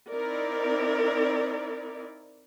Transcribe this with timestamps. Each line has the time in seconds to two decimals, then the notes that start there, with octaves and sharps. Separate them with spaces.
0.11 C4 D#4 E4 A#4 D5